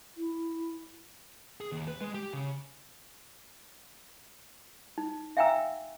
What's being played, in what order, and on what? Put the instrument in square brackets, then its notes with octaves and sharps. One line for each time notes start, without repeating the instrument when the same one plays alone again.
[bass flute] E4
[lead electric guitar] G#4
D#2
B4
G#3
G4
C#3
[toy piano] D#4
E5 F5 G5 G#5 A#5 E6